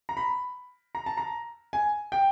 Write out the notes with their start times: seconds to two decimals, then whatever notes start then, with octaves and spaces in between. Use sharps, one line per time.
0.09 A#5
0.17 B5
0.95 A#5
1.06 A5
1.17 A#5
1.73 G#5
2.12 G5